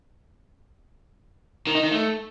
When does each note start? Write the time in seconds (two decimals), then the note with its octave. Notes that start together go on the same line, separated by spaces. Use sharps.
1.67 D#3
1.75 D#4
1.83 D#3
1.92 A3